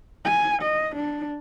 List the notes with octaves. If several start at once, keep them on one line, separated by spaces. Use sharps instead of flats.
G#5
D#5
D4